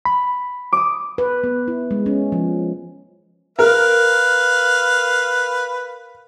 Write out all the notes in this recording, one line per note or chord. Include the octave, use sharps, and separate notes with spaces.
B5
D6 D#6
B4
B3
E4
G#3
C#4
F3
A#4 B4 F5